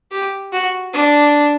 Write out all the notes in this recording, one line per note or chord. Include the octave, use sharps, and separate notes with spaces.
G4
F#4
D4